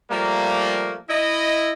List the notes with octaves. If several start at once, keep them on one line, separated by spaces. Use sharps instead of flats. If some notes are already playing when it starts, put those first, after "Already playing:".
F3 G3 A3 A#3
E4 D#5